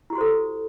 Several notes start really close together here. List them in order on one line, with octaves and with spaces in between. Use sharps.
E4 G4 F#4 C5 A4